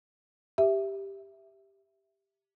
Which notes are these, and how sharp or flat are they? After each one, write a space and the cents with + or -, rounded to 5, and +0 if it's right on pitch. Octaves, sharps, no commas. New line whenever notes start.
G4 +0 E5 +0